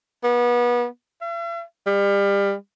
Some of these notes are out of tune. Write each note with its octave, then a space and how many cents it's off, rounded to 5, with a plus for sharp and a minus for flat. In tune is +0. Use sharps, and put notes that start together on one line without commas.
B3 -30
E5 +45
G3 +30